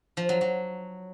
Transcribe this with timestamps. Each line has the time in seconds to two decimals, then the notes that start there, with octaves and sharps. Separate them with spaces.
0.17 F3
0.29 F#3
0.41 F#3